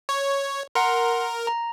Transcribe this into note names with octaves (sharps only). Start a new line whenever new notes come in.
C#5
A#4 F#5 C6
A#5